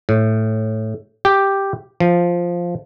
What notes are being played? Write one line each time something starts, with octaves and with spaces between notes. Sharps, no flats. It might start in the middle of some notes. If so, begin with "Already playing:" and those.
A2
G4
F3